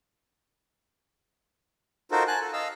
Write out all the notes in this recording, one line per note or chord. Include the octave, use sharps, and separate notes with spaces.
D#4 F4 F#4 A4 A#4 C5
G#5 A5 F#6
A4
D#5 F5 E6